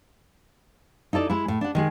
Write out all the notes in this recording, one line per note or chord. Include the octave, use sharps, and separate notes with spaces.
D#4 E4 A4 D5
G#3 E4
A2
D4 F#5
D#3 G#3 G#4